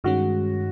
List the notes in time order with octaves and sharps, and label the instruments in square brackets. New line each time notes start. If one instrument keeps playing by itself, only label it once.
[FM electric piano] G2 D#3 G#3 C#4 [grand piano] F#4